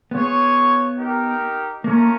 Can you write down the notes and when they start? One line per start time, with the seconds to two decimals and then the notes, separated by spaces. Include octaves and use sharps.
0.11 B3 F4 G#4 C#5
0.98 D#4 G4 A#4
1.84 A3 A#3 C#4 F4 A#4